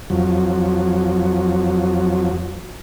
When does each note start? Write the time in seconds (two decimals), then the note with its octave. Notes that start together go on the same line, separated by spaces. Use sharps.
0.10 F2 F#3